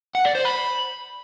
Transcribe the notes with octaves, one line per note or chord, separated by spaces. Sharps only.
F#5
D5
C5
B5